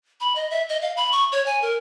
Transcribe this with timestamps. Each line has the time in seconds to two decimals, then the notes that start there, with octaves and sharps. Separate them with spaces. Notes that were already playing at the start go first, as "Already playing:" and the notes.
0.20 B5
0.36 D#5
0.51 E5
0.69 D#5
0.82 F5
0.97 B5
1.12 C#6
1.32 C#5
1.46 G#5
1.62 A#4